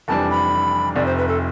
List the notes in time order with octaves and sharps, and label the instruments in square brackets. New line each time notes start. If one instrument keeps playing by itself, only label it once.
[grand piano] F1 F2 E3 G3 D4 [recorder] A5
[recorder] B5
[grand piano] F1 F2 C3 F3 [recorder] D5
[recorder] C5
B4
A4